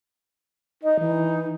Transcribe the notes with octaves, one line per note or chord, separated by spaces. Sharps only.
D#4 D#5
E3